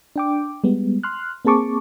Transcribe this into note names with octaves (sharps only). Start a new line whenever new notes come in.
D4 G5 D6
G3 G#3 B3
C6 F6 F#6
A#3 C4 G#4 A5 C#6 D6